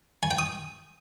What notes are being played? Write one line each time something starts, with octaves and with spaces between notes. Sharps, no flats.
G#5
G5
D#6